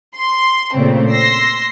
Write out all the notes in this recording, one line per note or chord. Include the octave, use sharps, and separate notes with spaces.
C6
A#2 C#3 A3 C4
C6 E6 A#6 C7